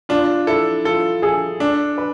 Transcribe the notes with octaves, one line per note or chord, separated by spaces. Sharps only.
D4 F4
E4 A4
F4 A4
G#4 A4
D4
B4